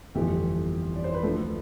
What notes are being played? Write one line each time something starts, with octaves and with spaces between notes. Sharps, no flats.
G1 F2 E3 A3 G4
D5
C5
B4
D2 D3 F3 A3 A4